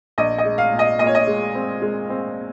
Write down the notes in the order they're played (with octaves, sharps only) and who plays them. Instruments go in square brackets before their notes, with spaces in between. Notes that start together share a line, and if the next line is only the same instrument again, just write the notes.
[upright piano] A#1 D#5
D#5
G#3
F5
A#2
D#5
A#2 D#5
C#5
D#5
G#3
C4
G#3
C4